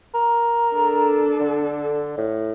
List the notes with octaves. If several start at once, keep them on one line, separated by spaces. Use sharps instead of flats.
A#4
D4 A4
D3
A2